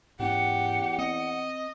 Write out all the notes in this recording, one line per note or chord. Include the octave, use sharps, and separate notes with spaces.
E2 G#2 C#4 G4 F#5
C4 D#5